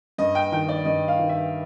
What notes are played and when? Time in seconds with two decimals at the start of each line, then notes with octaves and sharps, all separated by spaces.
0.18 G2 D#5
0.35 G5
0.52 D#3 G5
0.69 D5
0.85 G2 D#5
1.08 F5
1.19 D#3
1.29 E5